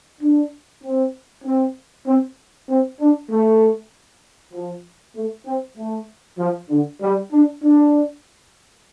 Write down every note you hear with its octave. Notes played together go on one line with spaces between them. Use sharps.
D4
C4
C4
C4
C4
D4
A3
F3
A3
C4
A3
F3
D3
G3
D4
D4